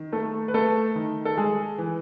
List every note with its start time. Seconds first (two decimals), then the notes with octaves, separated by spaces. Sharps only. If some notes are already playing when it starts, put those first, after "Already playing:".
Already playing: D#3
0.12 A3 A4
0.48 B4
0.54 A3 A4
0.95 D#3
1.25 A4
1.37 G#3 G#4
1.78 E3